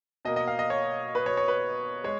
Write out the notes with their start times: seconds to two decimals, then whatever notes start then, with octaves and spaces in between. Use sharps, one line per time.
0.25 B2 A#3 D#5
0.36 D#5
0.48 F5
0.59 D#5
0.70 C#5
1.15 B4
1.26 C#5
1.37 C#5
1.48 B4
2.04 G#3 C#5